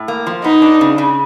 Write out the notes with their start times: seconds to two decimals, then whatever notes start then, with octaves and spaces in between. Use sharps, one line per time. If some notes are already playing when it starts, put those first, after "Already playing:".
Already playing: A2
0.08 A#3
0.27 F3
0.44 B3 D#4
0.62 D4
0.81 C#3
0.98 C#3